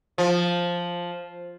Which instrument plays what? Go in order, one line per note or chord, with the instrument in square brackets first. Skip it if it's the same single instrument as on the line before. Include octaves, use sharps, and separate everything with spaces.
[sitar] F3